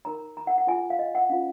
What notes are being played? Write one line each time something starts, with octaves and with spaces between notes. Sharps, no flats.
D#4 A#4 C#5 A#5
A#5
F#5
F#5
F4 G#4 C#5 G#5
F5
D#5
F#5
C#4 F4 C5 F5